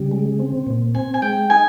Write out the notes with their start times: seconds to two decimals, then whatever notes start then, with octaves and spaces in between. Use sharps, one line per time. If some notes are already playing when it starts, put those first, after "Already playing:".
Already playing: C#3 G3
0.11 G#3
0.40 C4
0.67 A#2
0.94 C4 G#5
1.14 G#5
1.22 G#3 G5
1.50 D#4 G#5